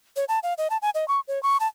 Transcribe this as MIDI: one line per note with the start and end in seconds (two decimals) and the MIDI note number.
0.16 0.25 73
0.29 0.39 81
0.43 0.54 77
0.58 0.68 75
0.70 0.77 81
0.82 0.90 80
0.95 1.07 75
1.08 1.20 85
1.28 1.41 73
1.43 1.57 85
1.60 1.67 81